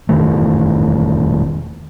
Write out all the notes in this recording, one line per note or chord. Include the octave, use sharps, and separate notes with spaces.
E1 F2 D#3 A3